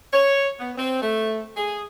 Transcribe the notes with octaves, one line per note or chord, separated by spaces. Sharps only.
C#5
B3
C4
A3
G#4